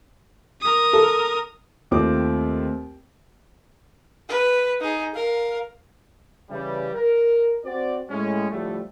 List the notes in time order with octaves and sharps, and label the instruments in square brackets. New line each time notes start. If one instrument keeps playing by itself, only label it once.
[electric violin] A#4 D#6
[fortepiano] A4
[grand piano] D#2 A3 C4 F4 C5 D6
[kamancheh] B4
D#4 G#4
A#4 F5
[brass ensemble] C#3 E3 G3
A#4
C4 F#4 C5 D5
A2 G#3 C#4
A2 D3 F3 G3 A3